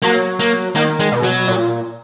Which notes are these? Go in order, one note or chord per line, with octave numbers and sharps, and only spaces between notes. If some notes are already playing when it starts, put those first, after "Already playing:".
F#3 A#3
A#3
D#3 A#3
G#3
B2
F#3
A#2